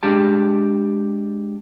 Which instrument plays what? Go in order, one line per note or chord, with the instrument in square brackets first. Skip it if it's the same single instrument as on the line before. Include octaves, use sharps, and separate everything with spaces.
[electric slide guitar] G#3 D4 G4 A5